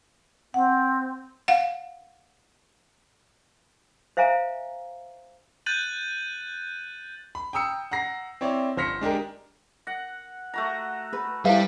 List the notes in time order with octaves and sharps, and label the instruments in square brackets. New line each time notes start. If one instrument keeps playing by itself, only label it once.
[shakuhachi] C4 [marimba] F#5
[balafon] F5 F#5
[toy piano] C5 E5 F5 G#5 A#5
[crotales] F#6 G6 A6 D#7 F#7
[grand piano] B5
G5 A#5 D#6 E6 C#7
F#5 A#5 A#6 C7
C4 E4 C#5 D5
G1 C5 F6 A#6 B6 C#7
G#3 D4 G4 A#4
[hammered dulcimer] F#5 [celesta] A#6
[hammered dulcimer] A3 F#4 A#5
[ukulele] B4
[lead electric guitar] G3 [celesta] E4 A4 B4 [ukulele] C5 E5 F5 [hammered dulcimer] B5